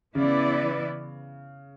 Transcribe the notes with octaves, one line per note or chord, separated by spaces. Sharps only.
C#3 E3 B3 E4 B4 D5